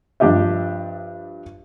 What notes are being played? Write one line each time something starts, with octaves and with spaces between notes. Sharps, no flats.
G2 F3 D4 G4 D#5 E5